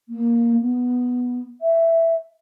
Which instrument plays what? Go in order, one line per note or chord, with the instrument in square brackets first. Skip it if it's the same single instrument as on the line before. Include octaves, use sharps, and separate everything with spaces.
[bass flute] A#3
B3
E5